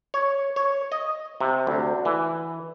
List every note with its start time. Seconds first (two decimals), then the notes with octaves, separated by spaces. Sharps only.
0.14 C#5
0.56 C#5
0.92 D#5
1.41 C3
1.67 D2
2.05 E3